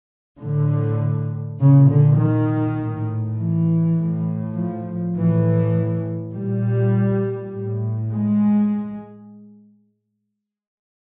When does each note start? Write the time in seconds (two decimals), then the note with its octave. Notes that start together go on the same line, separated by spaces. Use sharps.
0.41 A2 D3
1.59 A#2 C#3
1.89 D3
2.19 D#3
2.78 A2
3.37 E3
3.97 A2
4.56 F3
5.15 A2 E3
6.34 A#2 G3
7.52 A2
8.12 G#3